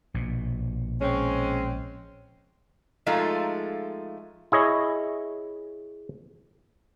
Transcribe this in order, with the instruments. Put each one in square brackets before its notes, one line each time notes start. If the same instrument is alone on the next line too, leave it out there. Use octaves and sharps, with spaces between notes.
[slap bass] A#1 B2
[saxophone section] G#3 C4 C#4
[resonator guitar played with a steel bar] F3 G#3 A3 D#4 F4 A4
[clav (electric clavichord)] E4 G#4 C#5 D#5